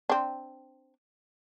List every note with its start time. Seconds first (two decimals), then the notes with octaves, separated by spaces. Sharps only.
0.09 C4 D4